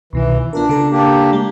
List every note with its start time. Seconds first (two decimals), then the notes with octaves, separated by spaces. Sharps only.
0.13 C2 B2 D#3 E3
0.53 B3 D4 F4 A#4
0.69 C#3 A4 A#5
0.91 A#3 D4 G4
1.33 G#3